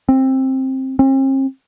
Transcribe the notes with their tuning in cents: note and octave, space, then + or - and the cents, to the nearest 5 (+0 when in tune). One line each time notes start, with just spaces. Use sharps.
C4 +15
C4 +45